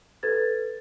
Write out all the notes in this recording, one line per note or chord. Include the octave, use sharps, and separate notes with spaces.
A4 B4 G#6 A6